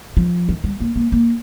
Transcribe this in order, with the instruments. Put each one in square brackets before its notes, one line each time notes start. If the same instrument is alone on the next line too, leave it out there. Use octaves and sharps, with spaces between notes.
[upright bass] F3
D#3
G3
A#3
A#3
A#3